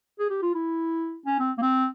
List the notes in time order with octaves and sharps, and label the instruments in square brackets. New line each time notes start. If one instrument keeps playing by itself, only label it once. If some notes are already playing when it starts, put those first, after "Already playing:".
[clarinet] G#4
G4
F4
E4
C#4
C4
A#3
C4